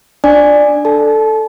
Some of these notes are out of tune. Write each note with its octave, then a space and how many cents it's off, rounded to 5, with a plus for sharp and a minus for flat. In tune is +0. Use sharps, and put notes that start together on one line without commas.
D4 +0 D5 +5 G#5 -5
A4 +0 A5 -30